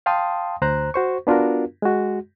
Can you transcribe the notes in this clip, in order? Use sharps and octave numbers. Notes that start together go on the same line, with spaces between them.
F5 G5 A5 C6 D#6
D2 C5 A#5 F#6
F#4 C5 C#6
B3 D4 F4 F#4 A#4
G#3 F#4